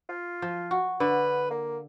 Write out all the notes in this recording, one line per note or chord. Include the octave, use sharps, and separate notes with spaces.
F4
F3
F#4
D3 B4
A#3